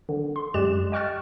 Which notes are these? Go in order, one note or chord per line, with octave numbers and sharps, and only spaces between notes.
D3
C6
F#2 G#3 G4 D5 F#6 E7
D#5 G5 C#6 F6 F#6 A6